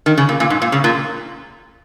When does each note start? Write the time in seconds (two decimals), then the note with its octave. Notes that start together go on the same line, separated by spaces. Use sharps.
0.06 D#3
0.18 C#3
0.29 A#2
0.40 A#2
0.50 G#2
0.62 A#2
0.72 C#3
0.84 A#2